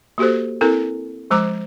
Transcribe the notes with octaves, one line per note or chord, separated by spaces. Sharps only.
A#3 F#4 G4 A4 C5
C4 E4 A4 A#4
F3 G#3 C5 A#5 D6